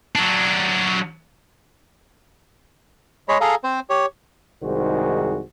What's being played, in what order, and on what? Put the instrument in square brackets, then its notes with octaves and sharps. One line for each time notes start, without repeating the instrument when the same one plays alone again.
[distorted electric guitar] F#3 D4
[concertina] G#3 G#4 C#5 B5
G#4 A4 F5 A#5
C4 C5
G4 C#5
[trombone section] C2 G#2 D#3 F#4 G#4 C5